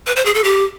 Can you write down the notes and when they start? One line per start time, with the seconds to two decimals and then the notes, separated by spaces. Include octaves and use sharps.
0.07 B4
0.16 C5
0.25 G#4
0.35 A4
0.44 G4